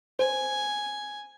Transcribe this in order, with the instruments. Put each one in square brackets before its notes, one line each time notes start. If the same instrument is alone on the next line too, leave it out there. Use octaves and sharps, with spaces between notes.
[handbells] C5 [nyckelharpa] G#5